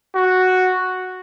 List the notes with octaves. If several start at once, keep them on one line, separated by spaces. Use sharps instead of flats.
F#4